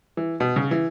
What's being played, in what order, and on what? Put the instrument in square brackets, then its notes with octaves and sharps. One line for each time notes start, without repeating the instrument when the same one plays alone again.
[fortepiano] E3
B2
C#3
E3